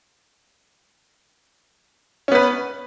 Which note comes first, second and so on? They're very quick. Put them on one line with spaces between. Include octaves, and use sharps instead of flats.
C#4 B3 B4